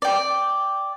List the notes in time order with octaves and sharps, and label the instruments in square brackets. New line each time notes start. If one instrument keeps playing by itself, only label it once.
[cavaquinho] D5 G5